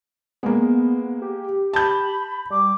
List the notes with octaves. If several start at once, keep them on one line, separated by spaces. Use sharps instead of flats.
G#3 A#3 B3
G4
A5 B5 G6
G3 D6